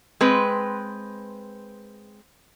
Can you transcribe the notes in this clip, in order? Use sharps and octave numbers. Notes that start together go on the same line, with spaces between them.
G#3 C4 B4